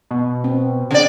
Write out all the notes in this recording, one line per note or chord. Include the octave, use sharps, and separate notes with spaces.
B2
C4
C#3 D5